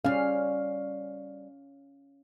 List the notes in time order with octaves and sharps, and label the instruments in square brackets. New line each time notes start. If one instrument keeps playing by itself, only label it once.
[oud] G3 G#4 [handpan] C#4 F5